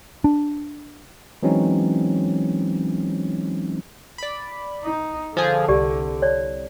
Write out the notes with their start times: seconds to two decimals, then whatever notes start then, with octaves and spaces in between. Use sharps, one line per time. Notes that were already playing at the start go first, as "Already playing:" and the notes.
0.24 D4
1.43 E3 F#3 G#3 C4 C#4 D#4
4.18 D5 B5
4.84 D#4
5.37 D3 F3 F4 G#4
5.68 C2 G4 D5
6.22 C#5 D5